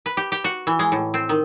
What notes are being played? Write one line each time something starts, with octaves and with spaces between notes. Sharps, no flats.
B4
G4
G4
F#4
E3
G#3
A2
C4
D#3